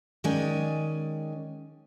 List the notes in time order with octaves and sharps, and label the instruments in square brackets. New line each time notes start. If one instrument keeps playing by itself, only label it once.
[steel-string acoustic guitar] D#3 G#3 C#4 D5 G#5